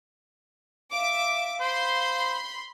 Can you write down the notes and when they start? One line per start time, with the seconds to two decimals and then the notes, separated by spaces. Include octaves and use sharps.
0.93 E5 F5 D6
1.61 C5 B5 C6